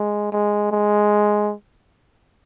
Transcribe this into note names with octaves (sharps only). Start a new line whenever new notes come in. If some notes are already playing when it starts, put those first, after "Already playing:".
Already playing: G#3
G#3
G#3